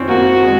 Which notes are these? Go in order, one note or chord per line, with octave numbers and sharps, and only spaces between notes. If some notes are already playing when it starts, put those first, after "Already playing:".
Already playing: C4 C#4
A#3 F#4
G#3